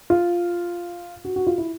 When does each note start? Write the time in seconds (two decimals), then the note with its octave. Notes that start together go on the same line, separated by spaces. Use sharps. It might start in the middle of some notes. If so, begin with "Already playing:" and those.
0.10 F4
1.25 F#4
1.36 F#4
1.47 F4
1.58 E4